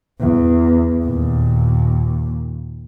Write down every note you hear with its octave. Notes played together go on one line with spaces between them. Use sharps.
E2
D#2 A#2